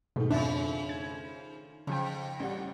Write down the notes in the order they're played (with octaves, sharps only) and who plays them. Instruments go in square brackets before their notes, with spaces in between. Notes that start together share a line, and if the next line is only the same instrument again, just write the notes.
[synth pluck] G#2 B2 [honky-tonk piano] D#3 A3
[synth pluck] F2 [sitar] C#3 F3 [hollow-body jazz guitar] D4 E5 A5
[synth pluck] G#6
[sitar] F2 [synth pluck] C#3 F3 G5
[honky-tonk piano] A1 G3 F#5